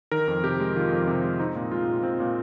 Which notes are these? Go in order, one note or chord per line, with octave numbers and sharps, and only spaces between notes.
D#3 A#4
F2
C3 G4
G#3
D#3 F4
F2
C3
G#3
C4 D#4
A#2
G#3 F4
A#2
C4
A#2